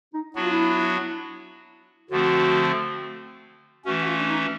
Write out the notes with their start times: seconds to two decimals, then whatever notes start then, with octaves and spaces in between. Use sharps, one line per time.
0.14 D#4
0.35 F#3 B3 D4 E4 F#4
0.43 F4
0.52 E4
2.10 D3 F3 A3 C4 F#4
3.85 E3 A3 C#4 F#4
4.01 F#4
4.07 F4
4.18 D4
4.30 D#4